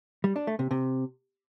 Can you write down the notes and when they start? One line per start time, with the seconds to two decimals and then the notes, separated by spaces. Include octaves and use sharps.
0.24 G3
0.36 D4
0.47 A3
0.59 C3
0.71 C3